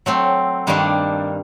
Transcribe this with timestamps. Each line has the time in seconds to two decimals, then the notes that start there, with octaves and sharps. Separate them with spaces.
0.06 F#3 A3 C4
0.67 G2 D#3 G3 A#3 D4